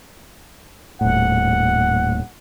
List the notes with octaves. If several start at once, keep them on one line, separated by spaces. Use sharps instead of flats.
D#1 A2 F#5